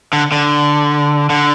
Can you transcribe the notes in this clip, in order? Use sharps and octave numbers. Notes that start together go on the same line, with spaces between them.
D3
D3
D3